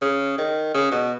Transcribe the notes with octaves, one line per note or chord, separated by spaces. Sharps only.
C#3
D#3
C#3
B2